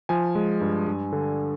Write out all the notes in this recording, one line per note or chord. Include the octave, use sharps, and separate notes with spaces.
F3 G#5
G#3
G2
G2
D3